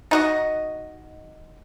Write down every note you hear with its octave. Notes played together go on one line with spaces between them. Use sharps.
D#4 F#4 D#5